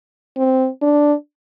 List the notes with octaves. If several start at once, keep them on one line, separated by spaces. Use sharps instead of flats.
C4
D4